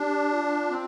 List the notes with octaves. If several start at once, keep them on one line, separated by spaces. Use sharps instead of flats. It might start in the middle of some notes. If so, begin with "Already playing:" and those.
Already playing: D4 G4
G4
F4
C4